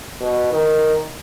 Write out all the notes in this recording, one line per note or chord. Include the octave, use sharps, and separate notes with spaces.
B2
D#3